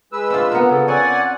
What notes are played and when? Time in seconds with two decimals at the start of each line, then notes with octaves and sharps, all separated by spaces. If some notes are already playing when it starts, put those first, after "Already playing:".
0.12 G#3 B4 E6
0.30 C4 D4 F4
0.52 B3 A#4
0.69 C#3 A4
0.88 C4 C#4 D5 F#5 G#5